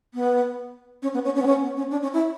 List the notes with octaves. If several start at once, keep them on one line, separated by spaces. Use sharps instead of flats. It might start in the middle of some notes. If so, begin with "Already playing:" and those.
B3
C#4
B3
C#4
C#4
B3
C#4
B3
C#4
D4
C#4
E4